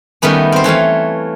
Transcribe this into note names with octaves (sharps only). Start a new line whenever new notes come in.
D#3 G3 A3 B3 C#4
C4 C5
E3 A3 C#5 F5